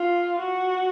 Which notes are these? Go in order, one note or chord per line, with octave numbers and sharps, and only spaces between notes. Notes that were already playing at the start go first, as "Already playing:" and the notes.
Already playing: F4
F#4